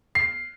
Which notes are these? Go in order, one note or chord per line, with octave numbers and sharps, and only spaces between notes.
C7